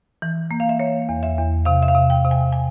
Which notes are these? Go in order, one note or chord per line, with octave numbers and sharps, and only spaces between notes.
E3
A#3
F5
E5
A#3 C#5
E2
E5
E2
C3 F5
E5
F5
C3
G5
C3
G#5
G#5